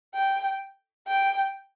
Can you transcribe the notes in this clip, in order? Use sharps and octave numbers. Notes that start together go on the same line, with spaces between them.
G5
G5